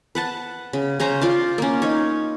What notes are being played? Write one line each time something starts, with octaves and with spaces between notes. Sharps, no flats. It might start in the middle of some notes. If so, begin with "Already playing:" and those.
B4 F#5 A5
C#3
C#3 C#4 C5 A#5
F4 D5 F5
A#3 C#4
D#4 C#5